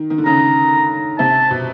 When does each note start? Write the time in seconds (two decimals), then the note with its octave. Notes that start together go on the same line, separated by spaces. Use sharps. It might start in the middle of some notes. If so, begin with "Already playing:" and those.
Already playing: D#3
0.10 D#3
0.18 D3
0.26 C#3 A#5
1.19 C3 A5
1.51 B2